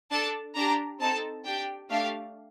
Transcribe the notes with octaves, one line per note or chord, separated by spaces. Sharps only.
D4 A4 A5
D4 G4 A#5
C4 D#4 A4 A5
D4 G4 G5
A3 D4 G4 F5